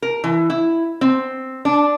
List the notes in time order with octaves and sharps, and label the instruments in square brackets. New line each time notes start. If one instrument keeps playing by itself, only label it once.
[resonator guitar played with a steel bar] A#4
E3
E4
C4
D4